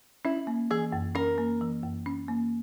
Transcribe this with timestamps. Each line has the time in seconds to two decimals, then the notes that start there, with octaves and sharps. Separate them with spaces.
0.25 C#4 E4
0.47 A#3
0.71 E3 G#4
0.92 F#2
1.15 C#4 A#4
1.38 A#3
1.61 E3
1.83 F#2
2.06 C#4
2.28 A#3